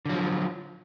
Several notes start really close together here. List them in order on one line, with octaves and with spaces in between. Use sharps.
D3 F#3 F3